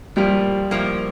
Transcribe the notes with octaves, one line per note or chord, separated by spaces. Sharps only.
A2 F3 G3 A#3
A2 F3 A#3